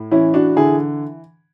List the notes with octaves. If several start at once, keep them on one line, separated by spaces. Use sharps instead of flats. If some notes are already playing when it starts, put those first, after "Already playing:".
Already playing: A2
E3 C#4 E4
D4 F#4
D3 E4 G#4